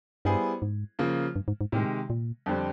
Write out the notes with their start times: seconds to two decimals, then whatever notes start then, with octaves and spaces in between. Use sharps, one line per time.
0.25 G2 G3 B3 E4 G#4 C5
0.62 G#2
0.99 C#3 F3 A#3
1.36 G2
1.48 G#2
1.61 G#2
1.72 A2 C3 D#3 G#3
2.10 A#2
2.46 F2 D3 G3 C4